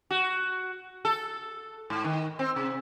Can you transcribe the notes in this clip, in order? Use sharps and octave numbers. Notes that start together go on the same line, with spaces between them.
F#4
A4
G#2
D#3
C4
C3